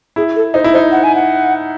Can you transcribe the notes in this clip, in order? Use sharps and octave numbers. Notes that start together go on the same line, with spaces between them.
E4 G#4
A4
D#4 C5
E4
D#4 C5
F#5
G#5
F#5